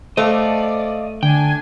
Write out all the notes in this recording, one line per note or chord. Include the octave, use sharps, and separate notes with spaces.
A3 C5 D5 D#5 F5
D3 D4 G5 G#5